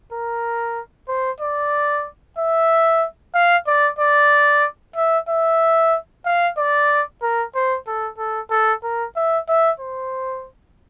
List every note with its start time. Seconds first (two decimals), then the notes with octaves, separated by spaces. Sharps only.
0.12 A#4
1.08 C5
1.40 D5
2.38 E5
3.34 F5
3.67 D5
3.99 D5
4.96 E5
5.29 E5
6.25 F5
6.57 D5
7.22 A#4
7.55 C5
7.87 A4
8.18 A4
8.51 A4
8.83 A#4
9.16 E5
9.48 E5
9.80 C5